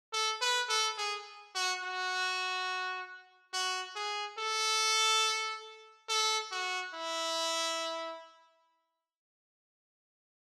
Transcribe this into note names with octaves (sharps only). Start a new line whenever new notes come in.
A4
B4
A4
G#4
F#4
F#4
F#4
G#4
A4
A4
F#4
E4